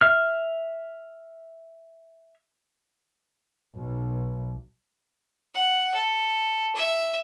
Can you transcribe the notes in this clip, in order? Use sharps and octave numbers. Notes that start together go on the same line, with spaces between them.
E5 F6
B1
F#5
A4
E5